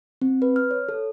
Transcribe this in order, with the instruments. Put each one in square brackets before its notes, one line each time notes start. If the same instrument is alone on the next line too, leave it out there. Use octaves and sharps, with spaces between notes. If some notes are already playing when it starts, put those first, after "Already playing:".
[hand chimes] C4
B4
F6
C#5
A4